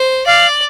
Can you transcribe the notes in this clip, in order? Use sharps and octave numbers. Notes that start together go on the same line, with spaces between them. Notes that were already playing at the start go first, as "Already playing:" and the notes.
Already playing: C5
D5 F5